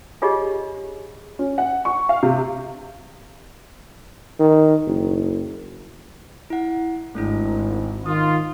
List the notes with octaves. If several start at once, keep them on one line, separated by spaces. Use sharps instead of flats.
D4 F4 G4 G#4 C#5 D#5
C#4
F#5
C#6
F5
C3
D#3
F#1
E4 F#5
G#1 A3 D4 E4
D#3 F4 D#6